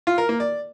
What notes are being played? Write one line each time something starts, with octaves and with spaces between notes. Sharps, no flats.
F4
A#4
A#3
D5